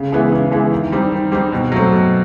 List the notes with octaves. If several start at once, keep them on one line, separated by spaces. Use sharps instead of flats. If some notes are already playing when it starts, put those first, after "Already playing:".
Already playing: C#3
E3 G#3 B3 E4
C#3
E3 G#3 B3 E4
D#3
G3 C4 D#4
D#3
G3 C4 D#4
B2
F#3 A3 C4
B2